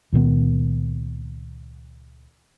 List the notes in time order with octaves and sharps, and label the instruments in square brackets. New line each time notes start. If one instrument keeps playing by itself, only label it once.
[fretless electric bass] C#2 A#2 D#3 B3